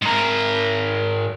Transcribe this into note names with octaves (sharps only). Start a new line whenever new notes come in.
G#2 A#4